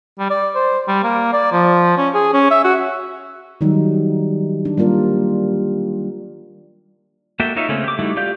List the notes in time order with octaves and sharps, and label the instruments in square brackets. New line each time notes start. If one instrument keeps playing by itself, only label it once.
[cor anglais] G3
D5
C5
G3
A#3
D5
F3
C#4
G#4
C#4
E5
F#4
[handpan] D#3 F#3 G3 D#4
D4
G3 A#3 F4 A#4 D5
[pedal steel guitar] A#3 F#4 A4 E5 G5
D#4 F4 C#5 E5
C#3 A3 A#3 C4 C#4
G4 D6
G3 A3 D#4 E4 F#4
F4 G4 D5 F5 G6